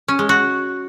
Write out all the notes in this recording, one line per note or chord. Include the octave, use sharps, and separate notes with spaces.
C#4
G#3
F#4